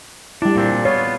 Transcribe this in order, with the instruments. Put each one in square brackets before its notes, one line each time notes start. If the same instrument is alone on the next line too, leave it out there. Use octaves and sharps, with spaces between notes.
[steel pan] G3 E4 [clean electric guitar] D4
[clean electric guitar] A#2 C4 D4
[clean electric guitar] B3 F4 [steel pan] C#5